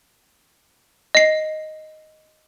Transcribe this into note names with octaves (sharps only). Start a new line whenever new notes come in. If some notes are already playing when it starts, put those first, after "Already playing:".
D#5 C7